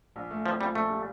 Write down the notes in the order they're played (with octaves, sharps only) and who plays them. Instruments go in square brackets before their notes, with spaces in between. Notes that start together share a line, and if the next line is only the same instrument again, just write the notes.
[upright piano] A#1
A3
[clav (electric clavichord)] F3 [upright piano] C4
[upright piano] A#2 [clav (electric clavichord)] G3
[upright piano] A#1 [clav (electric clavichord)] A3
[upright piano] G3